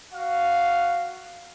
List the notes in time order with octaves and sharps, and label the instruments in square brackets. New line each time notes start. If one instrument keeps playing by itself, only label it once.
[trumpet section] F#4 F5